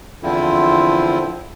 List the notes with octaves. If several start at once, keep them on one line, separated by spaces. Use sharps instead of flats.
E2 D3 F3 C4 E4